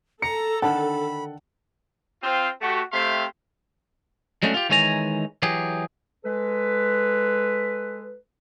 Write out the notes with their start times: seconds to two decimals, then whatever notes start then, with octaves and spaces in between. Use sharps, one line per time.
0.22 A4 A#5 C#7
0.62 D3 D#3 F#5 A5 B5
2.23 C4 F4
2.61 A3 F#4 G4
2.92 C3 A3 C4 E5 F5 C6
4.43 F#3 G#3 A3 C#4 D4 F#4
4.54 F4 G4
4.69 D#3 E3 G#3 C#5 G#5 A#5
5.42 E3 F#3 G4 G#4
6.24 G#3 A4 B4